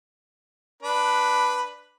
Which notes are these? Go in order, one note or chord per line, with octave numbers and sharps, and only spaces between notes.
D4 B4 B5